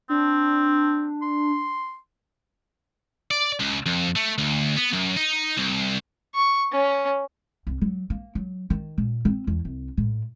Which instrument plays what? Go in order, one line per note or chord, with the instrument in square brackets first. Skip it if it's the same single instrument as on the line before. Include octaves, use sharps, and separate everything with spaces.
[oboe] C4 [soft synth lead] D4
[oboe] C6
[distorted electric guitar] D5
C#2
F2
A3
D2
B3
F#2
D#4
C2
[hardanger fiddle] C#6
C#4
[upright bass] C2
F#3
A#3
F#3
D#3
A#2
C4
E2
C2
A2